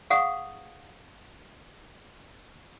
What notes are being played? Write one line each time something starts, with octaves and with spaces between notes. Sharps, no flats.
G#4 F5 F#5 C#6 D#6